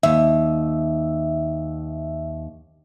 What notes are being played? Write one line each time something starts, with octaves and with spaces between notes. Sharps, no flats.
D#2 E5